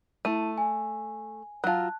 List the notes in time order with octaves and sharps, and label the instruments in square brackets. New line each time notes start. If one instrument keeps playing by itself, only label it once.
[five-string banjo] A3 [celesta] E4 A5 D#7
[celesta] G#5
[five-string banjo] F#3 F4 [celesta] A5 F#6